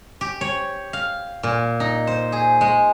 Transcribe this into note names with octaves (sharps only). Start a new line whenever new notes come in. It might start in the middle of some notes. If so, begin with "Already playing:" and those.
G4
C#5
F5
A#2
D#4
C5
G#4
G#3